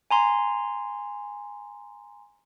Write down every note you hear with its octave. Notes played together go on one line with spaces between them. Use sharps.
G#5 A#5 C6